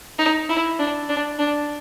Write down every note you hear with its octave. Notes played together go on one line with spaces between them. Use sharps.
D#4
E4
D4
D4
D4